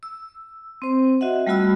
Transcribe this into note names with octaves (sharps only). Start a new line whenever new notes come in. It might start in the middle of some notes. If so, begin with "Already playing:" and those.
E6
C4 C5
F#4 D#5 E5 F#5
G3 A3 F4 F#4 B5 E6